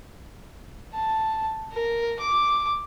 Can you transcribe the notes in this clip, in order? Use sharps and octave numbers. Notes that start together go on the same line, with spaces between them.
A5
A#4
D6